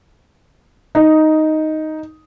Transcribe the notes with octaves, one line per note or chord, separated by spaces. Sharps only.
D#4